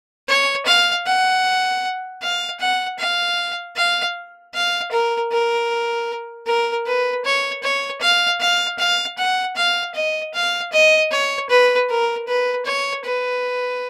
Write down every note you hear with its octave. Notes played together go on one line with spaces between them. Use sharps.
C#5
F5
F#5
F5
F#5
F5
F5
F5
A#4
A#4
A#4
B4
C#5
C#5
F5
F5
F5
F#5
F5
D#5
F5
D#5
C#5
B4
A#4
B4
C#5
B4